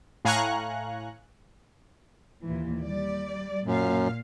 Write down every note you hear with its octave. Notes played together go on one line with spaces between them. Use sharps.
A2 F5 G#5 A#5 C#6 F#6
D#2 A#2 E3
G3 D5
F#2 A#2 F5